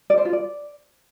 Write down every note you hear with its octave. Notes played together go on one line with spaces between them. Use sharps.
D5
C5
F4
D5